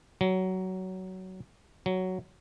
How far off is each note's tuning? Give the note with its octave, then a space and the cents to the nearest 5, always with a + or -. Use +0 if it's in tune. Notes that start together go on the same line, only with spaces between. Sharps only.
F#3 +15
F#3 +5